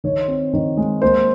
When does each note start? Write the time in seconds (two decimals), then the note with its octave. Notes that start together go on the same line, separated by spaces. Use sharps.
0.04 D#3 C#5
0.28 C4
0.53 D#3
0.77 G#3
1.02 A#3 C5